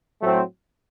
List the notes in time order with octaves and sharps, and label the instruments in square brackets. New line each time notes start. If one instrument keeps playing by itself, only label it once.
[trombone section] A2 F#3 A3 C4